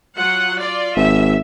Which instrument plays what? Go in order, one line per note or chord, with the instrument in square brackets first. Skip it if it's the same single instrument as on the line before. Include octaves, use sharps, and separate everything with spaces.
[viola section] F#3 F4 F#5
F4 D5
[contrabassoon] G#1 [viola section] E5